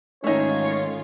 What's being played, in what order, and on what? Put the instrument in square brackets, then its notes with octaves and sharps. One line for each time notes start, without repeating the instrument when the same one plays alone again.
[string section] G#2 D#3 F4 [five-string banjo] A3 D#4 [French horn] C#4 [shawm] C#5